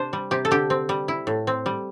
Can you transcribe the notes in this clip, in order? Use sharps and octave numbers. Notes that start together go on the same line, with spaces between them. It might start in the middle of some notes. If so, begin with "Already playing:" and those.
Already playing: C3 D4 C5
G3
C3 G4
A4
D3 G4
C4
G3
E4
A2
C4
G3